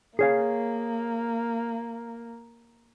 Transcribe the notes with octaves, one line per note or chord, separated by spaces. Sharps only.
A#3 G#4 C#5 F5